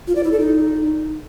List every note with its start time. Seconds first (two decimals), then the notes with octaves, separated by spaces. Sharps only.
0.07 F4
0.16 D5
0.24 E4
0.32 A4
0.40 D#4